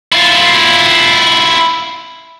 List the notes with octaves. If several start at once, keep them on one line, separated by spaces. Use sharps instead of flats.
E4 F4